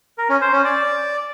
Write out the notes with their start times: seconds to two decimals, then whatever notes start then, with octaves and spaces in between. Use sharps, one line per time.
0.18 A#4
0.30 C#4
0.41 C5
0.53 C#4
0.64 D5